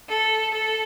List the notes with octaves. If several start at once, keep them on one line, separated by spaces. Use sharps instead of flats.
A4
A4